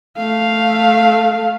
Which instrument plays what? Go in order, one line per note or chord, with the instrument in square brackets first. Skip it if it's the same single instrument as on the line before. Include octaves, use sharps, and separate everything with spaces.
[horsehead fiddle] A3 F5